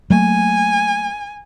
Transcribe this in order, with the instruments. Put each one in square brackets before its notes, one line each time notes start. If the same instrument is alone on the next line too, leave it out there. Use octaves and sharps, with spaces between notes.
[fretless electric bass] F#3 A3 A#3 [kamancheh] G#5